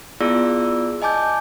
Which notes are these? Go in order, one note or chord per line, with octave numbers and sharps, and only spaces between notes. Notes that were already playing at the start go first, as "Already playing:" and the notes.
B3 E4 F4 G#4 D5 E6
D#5 G#5 A5 D6 G6